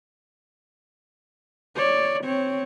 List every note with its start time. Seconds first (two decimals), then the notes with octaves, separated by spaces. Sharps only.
1.75 C#5 D5
2.24 C4 C#5